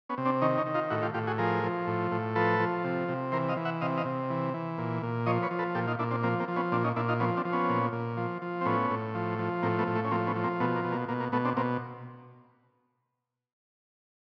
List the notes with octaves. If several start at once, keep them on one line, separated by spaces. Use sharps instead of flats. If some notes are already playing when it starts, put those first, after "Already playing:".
B3 C#4
C3
C4 D4
D#3 C#4 D#4
C#4 D#4
D#3
D#4 F4
A2 E4 F#4
F4 G4
A2 F4 G4
F#4 G#4
F3 G#4 A#4
F3
A2
A2
F3 A4 B4
F3
C3
C3
E3 A#4 C5
D#5 F5
E3
E5 F#5
C3 D#5 F5
D#5 F5
C3
E3
E3
A#2
A#2
F3 C#5 D#5
B4 C#5
F3
A4 B4
A#2 G4 A4
D#4 F4
A#2 D4 E4
C4 D4
F3 A#3 C4
A#3 C4
F3
B3 C#4
A#2 C4 D4
C#4 D#4
A#2 D4 E4
D#4 F4
F3 B3 C#4
C4 D4
F3
B3 C#4
A#2
A#2
F3
F3
C4
A2 B3 C#4
A2
F3
F3
A2 A#3 C4
A3 B3
A2
A3
C#4
F3 A#3 C4
B3 C#4
F3
A#3 C4
B2 A3 B3
A#3
B2
A#3
B2 A#3
A#3
B2 A3 B3
C4 D4
B2 A#3 C4